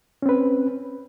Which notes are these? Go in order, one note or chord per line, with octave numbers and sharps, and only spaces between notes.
C4 C#4 B4